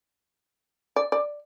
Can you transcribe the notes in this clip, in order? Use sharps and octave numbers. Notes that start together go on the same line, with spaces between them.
D5
D5